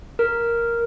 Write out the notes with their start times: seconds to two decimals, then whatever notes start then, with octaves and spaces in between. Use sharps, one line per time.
0.19 A#4